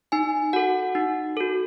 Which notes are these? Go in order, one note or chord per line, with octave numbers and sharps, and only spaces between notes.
D#4 G#5
F#4 A4 F#5
D#4
F#4 A4